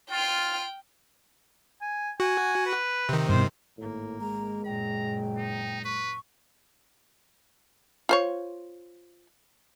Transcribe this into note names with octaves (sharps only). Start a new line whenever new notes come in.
F4 G5 F6
G#5
F#4 G#5
B4
C3 D#3
G2 B2 C5
G#1 A2 A#3
G#3 A#5
F#1 A#2 G5 A#5
D#4
B4 C#6
F4 C5 C#5